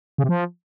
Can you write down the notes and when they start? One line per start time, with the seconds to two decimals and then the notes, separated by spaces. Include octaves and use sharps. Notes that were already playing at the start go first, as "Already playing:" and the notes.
0.18 C#3
0.24 C3
0.29 F3